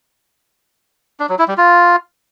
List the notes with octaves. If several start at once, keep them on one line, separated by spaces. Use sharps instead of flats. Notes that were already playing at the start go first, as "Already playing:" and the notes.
D4
F#3
E4
G3
F4